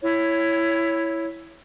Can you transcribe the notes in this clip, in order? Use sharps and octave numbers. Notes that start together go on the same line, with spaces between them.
E4 C#5